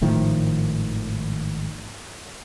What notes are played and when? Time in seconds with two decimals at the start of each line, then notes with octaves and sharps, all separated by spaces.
0.01 G#1 A2 D#3 F3